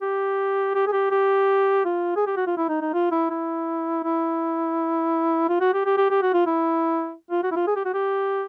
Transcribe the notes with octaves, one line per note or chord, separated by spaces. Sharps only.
G4
G4
G#4
G4
G4
F4
G#4
G4
F#4
F4
E4
D#4
D#4
F4
E4
E4
E4
F4
F#4
G4
G4
G4
G4
F#4
F4
E4
F4
F#4
E4
F4
G#4
G4
F#4
G4